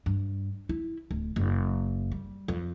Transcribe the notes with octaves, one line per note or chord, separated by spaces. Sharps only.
G2
E4
D1
F#1
G3
F2